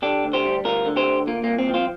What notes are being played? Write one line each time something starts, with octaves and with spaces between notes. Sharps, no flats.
D3 D4 G4
D2
G4 C5
G3
D2 F4 A#4
D3
G4 C5
D2
A#2 A#3
C2 A#3
C4
F3
C4 F4